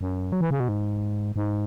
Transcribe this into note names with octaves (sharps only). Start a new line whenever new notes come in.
F#2
F#3
E3
C#3
B2
G#2
G#2